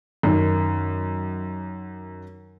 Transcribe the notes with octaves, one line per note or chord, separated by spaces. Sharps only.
F#2 D#3